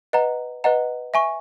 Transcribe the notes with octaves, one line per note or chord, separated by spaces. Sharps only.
B4 D#5 F#5 A#5
B4 D#5 F#5 A#5
E5 G#5 C#6